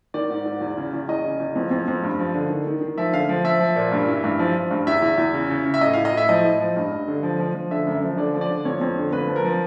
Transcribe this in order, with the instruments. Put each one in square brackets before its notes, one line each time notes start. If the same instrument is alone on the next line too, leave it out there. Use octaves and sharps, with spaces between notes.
[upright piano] D#3 D5
G#2
G#2
E2
C#3
E2
E2 D#5
C#3
E2
F2
F2
F2
G2
F3
D3
D#3
D#3
D#3
F3 E5
D3 F5
F3
F3 E5
F3
A#2
G2
E3
G2
F3
F3
G2
E2 E5
E2
E2
C#3
C#3
C#3
E5
A2 D#5
A2 F5
D#5
A2 E5
F3 D#5
A2
F3
G2
G2
D3
F3
F3
F3
D3 E5
F#2
F3
D3 D5
F3
D5
D3
F2 C#5
F2
D3
F2 B4
F3
A#4
F3